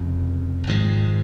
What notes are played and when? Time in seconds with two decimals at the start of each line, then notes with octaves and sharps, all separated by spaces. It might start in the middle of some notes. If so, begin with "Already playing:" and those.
Already playing: F1 F2 C#3 F3
0.67 G#1 G#2 F3 G#3